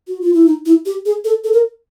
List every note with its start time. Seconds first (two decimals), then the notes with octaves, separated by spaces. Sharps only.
0.08 F#4
0.21 F4
0.34 E4
0.46 D#4
0.65 E4
0.86 G4
1.05 G#4
1.24 A4
1.44 A4
1.53 A#4